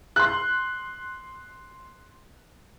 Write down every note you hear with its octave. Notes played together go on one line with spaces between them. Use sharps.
C6 F#6